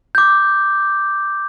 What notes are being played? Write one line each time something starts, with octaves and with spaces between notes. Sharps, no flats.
D6 G6